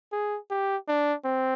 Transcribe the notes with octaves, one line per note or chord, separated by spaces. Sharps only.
G#4
G4
D4
C4